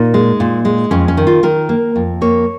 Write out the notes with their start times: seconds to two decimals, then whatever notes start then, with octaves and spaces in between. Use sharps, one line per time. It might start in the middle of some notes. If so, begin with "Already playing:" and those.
Already playing: A#2 D#4
0.14 G#3
0.40 A#2
0.65 G#3
0.91 F2 C#4
1.08 C#4
1.17 D#3
1.27 F4
1.43 D#3 A#4
1.69 A#3
1.96 F2
2.21 A#3 C#5